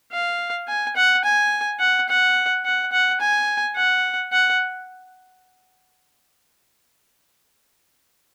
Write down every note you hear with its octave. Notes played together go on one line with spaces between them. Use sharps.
F5
G#5
F#5
G#5
F#5
F#5
F#5
F#5
G#5
F#5
F#5